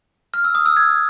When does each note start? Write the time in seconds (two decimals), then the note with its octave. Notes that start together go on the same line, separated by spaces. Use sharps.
0.34 F6
0.44 E6
0.55 D#6
0.66 E6
0.77 G#6